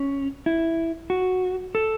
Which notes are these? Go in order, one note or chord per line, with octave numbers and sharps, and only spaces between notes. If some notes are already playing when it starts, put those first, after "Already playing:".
Already playing: C#4
E4
F#4
A4